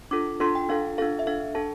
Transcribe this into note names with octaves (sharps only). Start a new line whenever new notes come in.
D4 F4 A4 D6
D4 F4 A4 C6
G5
D4 F4 A4 F5
D4 F4 A4 F5
E5
D4 A4 F5
D4 A4 A5